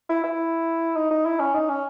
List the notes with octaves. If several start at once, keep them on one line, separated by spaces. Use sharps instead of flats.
E4
E4
D#4
D#4
E4
C#4
D#4
C#4